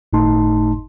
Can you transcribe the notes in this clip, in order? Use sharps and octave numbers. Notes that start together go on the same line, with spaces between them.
G1 A2 A3 D#4 A5 C6